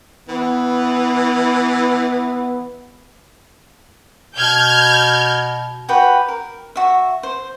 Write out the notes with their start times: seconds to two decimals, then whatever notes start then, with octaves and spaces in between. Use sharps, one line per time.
0.29 E3 B3
4.37 B2 F6 G6 G#6
5.89 F#4 G4 B4 G5
6.28 A#4
6.76 F#4 E5
7.23 C5